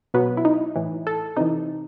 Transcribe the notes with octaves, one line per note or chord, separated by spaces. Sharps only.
B2 F#3 B3
E4
D#4
A2 E3
A4
C3 E3 D#4